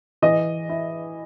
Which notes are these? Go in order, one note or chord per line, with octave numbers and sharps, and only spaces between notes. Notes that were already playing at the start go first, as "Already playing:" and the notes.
E3 D#5
E4